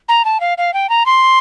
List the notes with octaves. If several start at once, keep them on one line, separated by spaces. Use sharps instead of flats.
A#5
A5
F5
F5
G5
A#5
C6